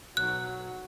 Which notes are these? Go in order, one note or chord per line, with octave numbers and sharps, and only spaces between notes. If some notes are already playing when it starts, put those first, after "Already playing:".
B1 F#3 F#6